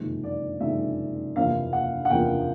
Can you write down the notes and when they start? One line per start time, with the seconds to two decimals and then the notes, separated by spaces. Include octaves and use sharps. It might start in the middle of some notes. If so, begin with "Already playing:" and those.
Already playing: F#1 F2 C3 D#3 G#3
0.24 D5
0.60 F#1 F2 C3 D#3 G#3 E5
1.35 F#1 E2 C3 F3 A#3 F5
1.73 F#5
2.05 F#5
2.10 F#1 E2 C3 F3 A#3 G5